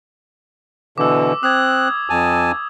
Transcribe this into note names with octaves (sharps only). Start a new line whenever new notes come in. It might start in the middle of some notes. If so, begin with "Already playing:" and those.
B2 D3 E3 D6 E6
C4 D#6 F#6 G#6
F2 G#5 A5